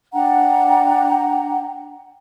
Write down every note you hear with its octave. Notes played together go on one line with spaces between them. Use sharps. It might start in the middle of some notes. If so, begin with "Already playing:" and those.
D4 F#5 G5 A#5